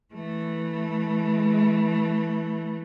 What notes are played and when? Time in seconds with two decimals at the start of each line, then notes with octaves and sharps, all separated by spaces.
0.14 E3 A3